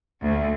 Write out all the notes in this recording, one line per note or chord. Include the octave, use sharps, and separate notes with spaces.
D2